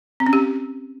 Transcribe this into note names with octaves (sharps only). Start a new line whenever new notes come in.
C4
C#4
G4